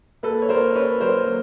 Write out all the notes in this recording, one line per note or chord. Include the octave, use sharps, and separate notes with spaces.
A#3 A4 B4
C#5
A#3 A#4 C5
C#4 B4 C#5
F#3 A#4 C5
A#3